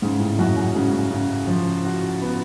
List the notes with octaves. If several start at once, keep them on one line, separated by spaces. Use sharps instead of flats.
G#2 C#3
A2
F#2 F#4
F#2
G#2 C#3
C#3
F3
F#4
B3